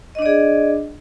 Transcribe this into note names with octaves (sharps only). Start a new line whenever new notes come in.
D4 G#4 D5 D#5